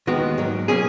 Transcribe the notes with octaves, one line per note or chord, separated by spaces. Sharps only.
D#2 D#3 G#3 B3 F#4
G#2 F#3 A#3
B2 A#3 C#4 G#4